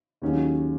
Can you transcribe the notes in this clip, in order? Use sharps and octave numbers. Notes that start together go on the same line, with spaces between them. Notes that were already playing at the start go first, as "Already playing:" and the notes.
D#2 D#3 F#3 C#4 G#4